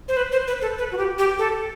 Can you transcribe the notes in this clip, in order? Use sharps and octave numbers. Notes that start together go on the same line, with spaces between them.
C5
B4
C5
B4
A4
B4
F#4
G4
G4
A4